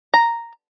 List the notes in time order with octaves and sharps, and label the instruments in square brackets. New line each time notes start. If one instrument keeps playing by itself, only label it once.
[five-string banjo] A#5